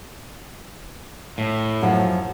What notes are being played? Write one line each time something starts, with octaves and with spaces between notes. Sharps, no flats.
A2
F#2 F3